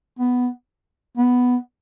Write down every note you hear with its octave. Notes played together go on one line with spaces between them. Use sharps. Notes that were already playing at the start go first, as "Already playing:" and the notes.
B3
B3